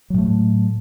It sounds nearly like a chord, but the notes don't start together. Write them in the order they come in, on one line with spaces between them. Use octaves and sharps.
F#3 A2 A3